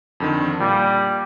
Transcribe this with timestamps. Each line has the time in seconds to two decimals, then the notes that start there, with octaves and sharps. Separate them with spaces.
0.20 F2 D3 D#3
0.60 A#2 G3